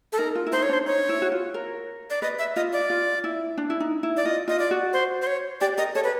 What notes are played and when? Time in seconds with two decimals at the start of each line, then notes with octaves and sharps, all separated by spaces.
0.13 A4
0.18 D#4 A#4
0.35 F4
0.46 E4
0.52 D#4 C5
0.63 C#5
0.69 D4 C5
0.86 D#4 C#5
1.09 E4
1.22 F#4
1.32 F4
1.54 A#4
2.10 D5
2.22 B4 D#5
2.39 E5
2.56 F4 D#5
2.73 D5
2.90 F4
3.24 E4
3.58 D4
3.70 E4
3.80 D#4
4.03 E4
4.17 D5
4.25 F4 D#5
4.48 F4 D#5
4.59 D5
4.71 F#4
4.93 C5
5.22 C5
5.27 C#5
5.61 G4 D5
5.78 A#4 D#5
5.95 A4 C#5
6.04 B4